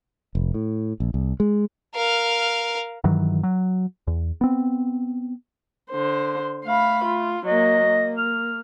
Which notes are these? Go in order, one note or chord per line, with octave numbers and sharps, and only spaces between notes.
F1
A2
A#1
C2
G#3
A#4 F5
G2 D#3 E3 F#3
F#3
E2
B3 C4
D3 C5
A3 F5 B5
F4
F#3 A#3 D#5
A#3
F6